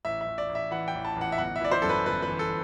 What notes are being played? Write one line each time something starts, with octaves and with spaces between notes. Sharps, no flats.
A1 E5
E5
A1
D5
A1
E5
E3 F#5
G5
A1
A5
A1
F#5
E5
G1 F#5
E5
E3 D5
C5
F#2 A4
B4
G1 B4
B4
E3
A4